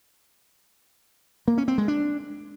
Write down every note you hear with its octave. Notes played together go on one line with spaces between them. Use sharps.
A#3
C#4
C4
G#3
D4